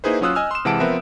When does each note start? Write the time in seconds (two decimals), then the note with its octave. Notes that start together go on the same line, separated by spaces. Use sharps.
0.04 A#3 D#4 E4 G#4 B4 C5
0.21 F#3 C#4 F4 D#6 E6 F#6
0.35 D#5 G#5 E6 F6
0.51 C6 E7
0.65 C3 E3 G#3 F#5 A5 D7
0.80 F3 B3 C4 A#4 B4 E5